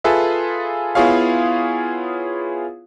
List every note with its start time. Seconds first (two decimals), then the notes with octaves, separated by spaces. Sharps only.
0.04 F4 G#4 A4 B4 E5
0.95 B3 E4 F4 G#4 C#5 F5